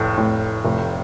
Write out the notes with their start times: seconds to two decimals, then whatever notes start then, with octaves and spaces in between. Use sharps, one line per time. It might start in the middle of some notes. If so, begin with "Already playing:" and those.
Already playing: F1 A2
0.18 A2
0.65 F1